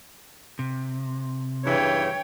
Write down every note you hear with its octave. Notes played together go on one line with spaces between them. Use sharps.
C3
G2 C#3 E3 C#5 G5